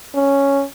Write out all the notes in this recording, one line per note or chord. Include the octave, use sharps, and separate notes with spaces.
C#4